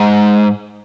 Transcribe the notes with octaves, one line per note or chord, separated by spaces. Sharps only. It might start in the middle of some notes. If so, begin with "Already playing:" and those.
Already playing: G#2